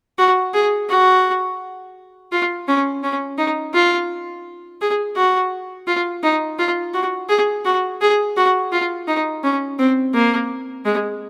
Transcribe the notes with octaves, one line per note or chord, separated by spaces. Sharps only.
F#4
G#4
F#4
F4
C#4
C#4
D#4
F4
G#4
F#4
F4
D#4
F4
F#4
G#4
F#4
G#4
F#4
F4
D#4
C#4
C4
A#3
G#3